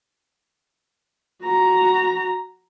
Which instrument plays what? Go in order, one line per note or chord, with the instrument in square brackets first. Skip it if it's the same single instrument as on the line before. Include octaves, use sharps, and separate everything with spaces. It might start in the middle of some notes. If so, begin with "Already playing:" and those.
[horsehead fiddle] F#4 A#5